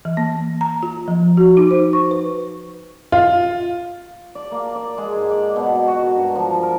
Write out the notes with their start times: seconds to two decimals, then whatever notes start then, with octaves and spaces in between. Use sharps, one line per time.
0.05 E3
0.17 A#3
0.61 A#5
0.83 F4
1.08 F3
1.37 F#4
1.57 D#4
1.71 C5
1.93 C#6
2.11 B4
3.12 F4
4.35 D5
4.52 A#3
4.76 D5
4.98 G#3
5.16 G#2
5.31 D5
5.56 B2
5.88 F#4
6.03 A#4
6.16 G2
6.35 F3
6.63 A#4